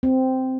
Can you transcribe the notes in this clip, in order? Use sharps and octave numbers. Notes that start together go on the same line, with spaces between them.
C4